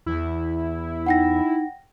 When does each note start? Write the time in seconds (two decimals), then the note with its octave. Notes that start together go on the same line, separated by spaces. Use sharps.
0.06 E2 E4
1.06 D#4 F#5 G5 A#6